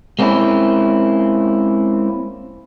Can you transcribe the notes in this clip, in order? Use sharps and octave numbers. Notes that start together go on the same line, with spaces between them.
G#3 A#3 C4 C#4 E4